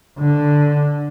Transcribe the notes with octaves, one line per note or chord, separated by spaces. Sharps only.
D3